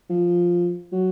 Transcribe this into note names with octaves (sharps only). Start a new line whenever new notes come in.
F3
F#3